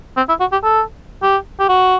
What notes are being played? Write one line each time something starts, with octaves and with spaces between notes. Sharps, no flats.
C4
E4
F#4
G4
A4
G4
G4
F#4